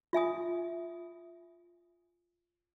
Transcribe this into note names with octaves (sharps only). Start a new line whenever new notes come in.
F4 E5 G#5 D#6